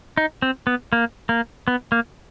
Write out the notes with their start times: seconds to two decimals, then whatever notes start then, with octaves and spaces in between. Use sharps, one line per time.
0.17 D#4
0.42 C4
0.67 B3
0.93 A#3
1.29 A#3
1.68 B3
1.92 A#3